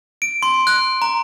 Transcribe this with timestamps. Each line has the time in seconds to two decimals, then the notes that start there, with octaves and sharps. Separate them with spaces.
0.22 D7
0.43 C6
0.67 F#6
1.02 A#5